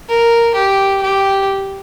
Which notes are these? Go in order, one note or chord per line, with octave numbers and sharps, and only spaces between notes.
A#4
G4
G4